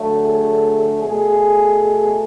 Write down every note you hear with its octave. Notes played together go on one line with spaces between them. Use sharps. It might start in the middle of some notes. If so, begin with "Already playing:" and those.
Already playing: D3 F#3 A3
G#4
B2 A3 G#4